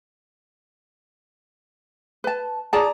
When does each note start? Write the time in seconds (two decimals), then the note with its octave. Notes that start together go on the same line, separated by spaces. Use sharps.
2.24 B4 A5
2.73 G#4 D5 A5 A#5